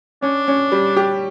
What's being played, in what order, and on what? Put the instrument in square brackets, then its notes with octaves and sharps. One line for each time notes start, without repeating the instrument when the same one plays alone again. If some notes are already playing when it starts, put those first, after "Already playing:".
[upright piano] C#4 [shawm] D4
[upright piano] C#4
G3
G4